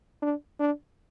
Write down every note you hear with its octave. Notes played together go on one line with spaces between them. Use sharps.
D4
D4